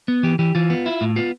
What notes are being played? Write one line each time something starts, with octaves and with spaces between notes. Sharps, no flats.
B3
E3 G4
E3 G4
E3 F4
B3
E4
A2
B3 F4